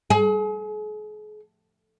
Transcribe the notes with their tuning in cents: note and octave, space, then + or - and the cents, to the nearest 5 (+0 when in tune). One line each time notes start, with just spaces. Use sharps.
G#4 +40